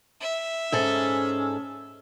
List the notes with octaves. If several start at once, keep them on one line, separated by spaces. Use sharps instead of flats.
E5
G#2 C#4 G#4 A4 E6